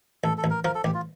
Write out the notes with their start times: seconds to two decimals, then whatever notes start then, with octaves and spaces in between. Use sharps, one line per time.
0.24 A1 A4
0.38 A4
0.44 A1
0.50 A#4
0.64 F3 A#4
0.75 A4
0.84 A1 G4
0.94 F4